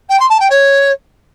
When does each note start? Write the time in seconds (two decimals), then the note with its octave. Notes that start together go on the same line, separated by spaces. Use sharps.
0.09 G5
0.19 C6
0.29 A5
0.40 G5
0.50 C#5